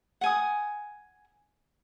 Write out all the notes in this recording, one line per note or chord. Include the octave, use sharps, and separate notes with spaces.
F#5 G#5 D#6